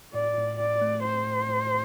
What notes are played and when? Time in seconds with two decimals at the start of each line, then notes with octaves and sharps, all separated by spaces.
0.14 A2 D5
0.38 A2
0.60 A2 D5
0.82 A3
1.04 A2 C5
1.27 A2
1.49 A2